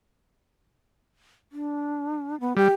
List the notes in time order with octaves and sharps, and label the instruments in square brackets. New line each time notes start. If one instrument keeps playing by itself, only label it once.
[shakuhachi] D4
B3
[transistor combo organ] G3 [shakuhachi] G4